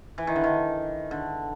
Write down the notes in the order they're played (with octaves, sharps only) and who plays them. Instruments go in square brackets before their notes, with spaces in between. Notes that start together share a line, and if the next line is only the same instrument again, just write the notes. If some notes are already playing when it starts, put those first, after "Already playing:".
[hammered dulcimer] E3
D#3
D3
D#3
D3